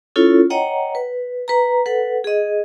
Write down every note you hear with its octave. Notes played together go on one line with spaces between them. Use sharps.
C#4 E4 F4 A4 C#5
C#5 D#5 F#5 G5 A#5
B4
B4 A#5
A4 B4 F#5
G#4 D#5